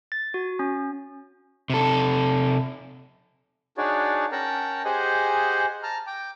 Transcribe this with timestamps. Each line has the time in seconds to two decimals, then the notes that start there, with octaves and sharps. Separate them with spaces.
0.12 A6
0.34 F#4
0.59 C#4
1.70 C3 A4
3.78 D4 D#4 F#4 G#4 C#5 D5
4.32 C#4 A#4 F#5 G5 A5 A#5
4.85 G4 G#4 C5 D#5 F#5 G#5
5.83 A5 A#5 F6
6.07 G5 D6